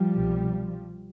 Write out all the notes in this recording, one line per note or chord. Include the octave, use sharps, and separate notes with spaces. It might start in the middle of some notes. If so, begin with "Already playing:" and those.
Already playing: F3 G3
C2 B2